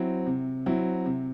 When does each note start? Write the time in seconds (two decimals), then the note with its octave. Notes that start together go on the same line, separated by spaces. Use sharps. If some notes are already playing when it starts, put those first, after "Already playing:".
Already playing: F#3 C4 E4
0.26 C3
0.66 F#3 C4 E4
1.06 C3